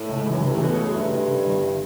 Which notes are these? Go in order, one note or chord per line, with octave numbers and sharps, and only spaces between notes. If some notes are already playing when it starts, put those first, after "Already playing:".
Already playing: A2
C#2
F#2 E3
G2 E3
A2
B2 A3
C#3 A3
F#2
G2 E4
D3
D3
G1